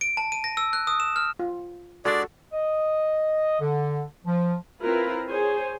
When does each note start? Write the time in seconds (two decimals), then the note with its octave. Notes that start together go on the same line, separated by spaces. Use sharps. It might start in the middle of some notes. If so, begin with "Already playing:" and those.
0.01 D7
0.17 A5
0.32 D#7
0.44 A#6
0.57 E6
0.73 F#6
0.87 D#6
1.00 E7
1.16 F6
1.39 F4
2.05 G#3 D4 F#4 A4 D5
2.53 D#5
3.60 D3
4.25 F3
4.81 C4 E4 F4 A#4 B4
5.28 G#4 C5 C#5 G#5